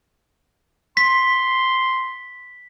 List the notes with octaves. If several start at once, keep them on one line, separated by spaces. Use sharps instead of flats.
C6 B6